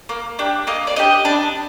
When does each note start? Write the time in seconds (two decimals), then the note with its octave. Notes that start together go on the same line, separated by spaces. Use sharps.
0.09 A#3
0.39 D4 G4
0.67 A#3 D#5
0.87 D5
0.96 D4 G4 D#5
1.25 D4